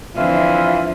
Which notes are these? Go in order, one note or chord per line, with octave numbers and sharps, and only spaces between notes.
F2 D3 E3 F4 E5